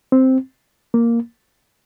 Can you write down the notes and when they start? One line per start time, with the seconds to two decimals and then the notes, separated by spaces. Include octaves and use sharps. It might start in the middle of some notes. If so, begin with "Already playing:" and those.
0.12 C4
0.94 A#3